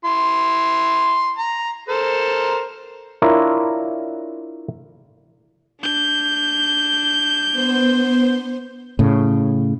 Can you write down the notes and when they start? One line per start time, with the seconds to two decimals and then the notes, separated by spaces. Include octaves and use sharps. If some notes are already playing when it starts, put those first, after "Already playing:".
0.05 E4 C6
1.39 A#5
1.89 A4 A#4 C5
3.22 D4 E4 F4 A#4 C#5
5.81 D4 G6
7.52 B3 C5
8.99 A2 C#3